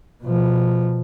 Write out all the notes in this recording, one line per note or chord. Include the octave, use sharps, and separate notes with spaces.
B2 F3